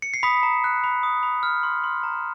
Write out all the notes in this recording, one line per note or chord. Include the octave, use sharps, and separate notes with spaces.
C#7
C7
B5 D#6 B6
A#5
F#6
B5
D#6
B5
F6
C6
C6
A#5